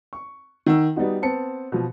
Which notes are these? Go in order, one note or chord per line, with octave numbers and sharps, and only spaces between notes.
C#6
D#3 F#5 E6
G3 B3 D#4 F#4
B3 C4 A5 C#7
B2 F3